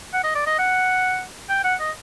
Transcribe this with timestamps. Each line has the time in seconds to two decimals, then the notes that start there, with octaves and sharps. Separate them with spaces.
0.13 F#5
0.24 D#5
0.35 D5
0.46 D#5
0.59 F#5
1.50 G5
1.64 F#5
1.80 D#5